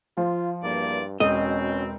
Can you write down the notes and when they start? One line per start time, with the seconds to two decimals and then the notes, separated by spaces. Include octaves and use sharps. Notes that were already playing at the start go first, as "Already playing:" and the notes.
0.17 F3 F4
0.63 E2 G2 A#3 D5
1.20 E1 B2 C4 C#4 D#5